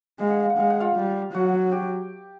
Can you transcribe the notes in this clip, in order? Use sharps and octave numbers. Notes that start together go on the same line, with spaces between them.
G#3 F5
F#5
F5
F#5
G#3 F5
F#5
F4 F5
G3
F#3 F#4 F#5
G4 G5